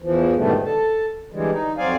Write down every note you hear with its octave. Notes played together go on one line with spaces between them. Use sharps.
E2 E3 F3
G#2 B2 D3 D#3 G3 A3
A4
D3 E3 G3 G#3
D#4
F2 F#3 C4 D5 F5 G#5